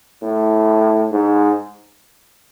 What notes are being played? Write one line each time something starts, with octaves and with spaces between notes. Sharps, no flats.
A2
G#2